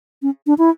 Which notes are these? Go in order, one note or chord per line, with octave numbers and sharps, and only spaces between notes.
C#4
D4
E4